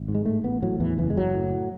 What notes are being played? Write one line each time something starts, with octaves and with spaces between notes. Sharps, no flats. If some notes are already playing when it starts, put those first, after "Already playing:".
Already playing: G#1
G#2
G#3
A2 A3
A1 B3
A2 F#3
E2 E3
F#1 E3
G#3
F#1 F#3
A2